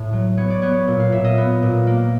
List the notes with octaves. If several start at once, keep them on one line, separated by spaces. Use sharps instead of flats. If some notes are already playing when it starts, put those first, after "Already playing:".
Already playing: A2
F#3
B3 C#5
D5
B3 C#5
A#2
F5
A#2 E5
D#5
B3
A#2
A#3